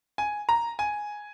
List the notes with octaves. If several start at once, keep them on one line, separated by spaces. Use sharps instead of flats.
G#5
A#5
G#5